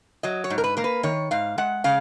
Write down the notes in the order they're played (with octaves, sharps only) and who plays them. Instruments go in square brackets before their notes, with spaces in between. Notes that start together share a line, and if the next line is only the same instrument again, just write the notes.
[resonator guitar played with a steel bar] F#3 D#5
C#5
G#2
A#4
B4
A#3 A#4
B4
D#3 C#5
G#2 F5
G#3 F#5
C#3 F5